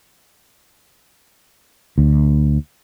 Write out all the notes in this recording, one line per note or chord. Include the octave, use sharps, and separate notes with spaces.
D2